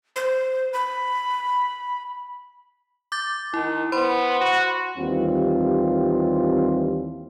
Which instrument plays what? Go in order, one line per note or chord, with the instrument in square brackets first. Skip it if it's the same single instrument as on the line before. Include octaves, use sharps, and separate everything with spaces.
[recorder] C5
B5
[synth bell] D6 G6 A6
[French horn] D#3 [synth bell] E4
[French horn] B3 [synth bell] C5 B5 C6
[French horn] F#4
[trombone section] D#2 E3 G3 C4 F4